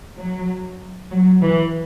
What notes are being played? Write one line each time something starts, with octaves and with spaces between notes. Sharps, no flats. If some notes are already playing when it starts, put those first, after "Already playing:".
F#3
F#3
E3